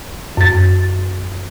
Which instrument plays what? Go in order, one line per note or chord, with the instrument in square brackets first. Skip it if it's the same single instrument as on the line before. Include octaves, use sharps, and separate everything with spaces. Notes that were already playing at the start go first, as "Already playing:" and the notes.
[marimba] F#2 A6